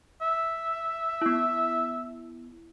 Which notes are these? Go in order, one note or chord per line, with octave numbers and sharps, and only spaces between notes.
E5
B3 E4